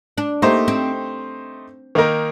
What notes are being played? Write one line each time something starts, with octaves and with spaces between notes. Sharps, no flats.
D4
A3 A#3 D#4 G4 C5
C4
D#3 A#3 D#4 A#4